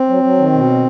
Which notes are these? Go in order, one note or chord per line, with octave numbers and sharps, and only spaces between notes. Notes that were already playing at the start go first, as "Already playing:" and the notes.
Already playing: C4
F#3
F#3
D#3
B2